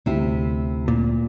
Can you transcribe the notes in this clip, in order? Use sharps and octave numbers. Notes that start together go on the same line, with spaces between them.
D2 C3 E4
A#2